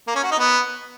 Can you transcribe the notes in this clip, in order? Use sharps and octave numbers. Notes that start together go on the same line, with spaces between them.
A#3
C#4
F#4
D#4
B3